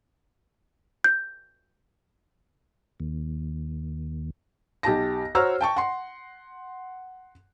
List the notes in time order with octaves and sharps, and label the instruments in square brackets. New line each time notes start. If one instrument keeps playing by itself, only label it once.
[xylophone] G6
[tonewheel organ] D#2
[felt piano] B1 G4 A5 A#6
F#4 C5 C#5 A#5 E6 F6
G5 A5 C#6
F#5 C6